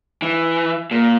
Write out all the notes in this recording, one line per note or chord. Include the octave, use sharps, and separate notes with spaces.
E3
A#2